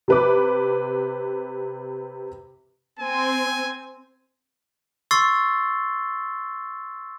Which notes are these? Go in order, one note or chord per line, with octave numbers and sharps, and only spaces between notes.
C3 B4 D6
C4 G#5
C6 C#6 E6 A6 C7 G7